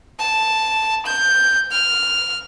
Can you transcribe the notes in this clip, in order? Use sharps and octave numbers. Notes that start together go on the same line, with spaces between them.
A5
G6
F6